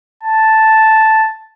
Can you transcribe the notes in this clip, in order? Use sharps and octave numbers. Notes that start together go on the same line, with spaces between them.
A5